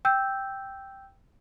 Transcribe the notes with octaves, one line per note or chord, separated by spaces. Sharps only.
G5 E6 G6